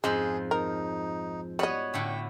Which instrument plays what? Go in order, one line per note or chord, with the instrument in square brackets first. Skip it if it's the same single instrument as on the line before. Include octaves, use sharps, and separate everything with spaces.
[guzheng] F2 G#2 F3 [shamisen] G#3 [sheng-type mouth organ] G#4
[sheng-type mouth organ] D#4 [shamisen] A#4
[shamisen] G3 D#5 [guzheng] B3 F#4 C#5
[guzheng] A2 D3 A3 [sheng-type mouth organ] G5